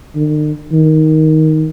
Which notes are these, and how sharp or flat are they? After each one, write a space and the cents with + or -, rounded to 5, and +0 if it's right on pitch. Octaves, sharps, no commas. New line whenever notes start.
D#3 -45
D#3 +10